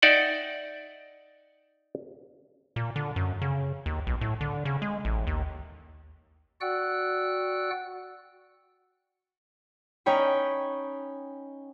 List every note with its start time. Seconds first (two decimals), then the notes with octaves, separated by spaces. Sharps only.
0.02 D#4 D5 E5 F#5 G5
2.76 A#2
2.96 D3
3.16 F#2
3.42 C#3
3.86 D#2
4.07 B1
4.21 A2
4.41 D3
4.65 C#3
4.82 G#3
5.05 A1
5.27 D#2
6.61 F#4 D5 F#5 G5 E6 F#6
10.06 C#4 D#4 C#5 G5 B5